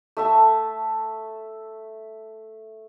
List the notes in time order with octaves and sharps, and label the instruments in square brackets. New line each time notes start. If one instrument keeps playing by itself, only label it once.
[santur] A3 E5 A5